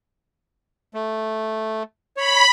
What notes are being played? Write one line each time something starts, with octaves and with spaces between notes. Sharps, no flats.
A3
C#5 B5